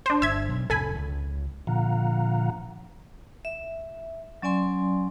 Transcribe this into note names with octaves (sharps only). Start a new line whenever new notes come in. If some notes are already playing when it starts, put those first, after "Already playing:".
D4 C5
G1 E5 G#6
B2 F#3
C2 F2 C3 A4 G#5 B5
C#2
A#2 D3 F3 F5 F#5 A#5
E5
F#3 C#4 D5 G#5 C6